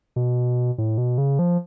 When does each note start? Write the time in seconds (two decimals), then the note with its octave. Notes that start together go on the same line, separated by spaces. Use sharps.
0.16 B2
0.78 A2
0.98 B2
1.18 C#3
1.39 F3